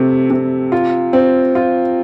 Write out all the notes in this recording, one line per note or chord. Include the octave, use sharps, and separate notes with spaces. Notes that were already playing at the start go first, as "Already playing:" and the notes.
Already playing: C3 A3
C3
F4
C4
F4